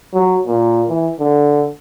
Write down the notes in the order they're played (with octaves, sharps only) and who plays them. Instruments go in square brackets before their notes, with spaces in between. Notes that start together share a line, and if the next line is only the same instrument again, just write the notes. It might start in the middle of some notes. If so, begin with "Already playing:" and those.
[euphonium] F#3
A#2
E3
D3